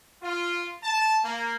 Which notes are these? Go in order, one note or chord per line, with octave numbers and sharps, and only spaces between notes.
F4
A5
A#3